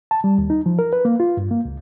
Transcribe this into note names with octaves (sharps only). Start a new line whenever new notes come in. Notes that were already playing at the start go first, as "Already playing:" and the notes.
A5
G3
D#2
D#4
F3
A#4
B4
A#3
F4
G2
A#3
C#2